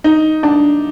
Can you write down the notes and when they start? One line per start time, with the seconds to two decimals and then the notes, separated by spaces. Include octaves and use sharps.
0.04 D#4
0.43 D4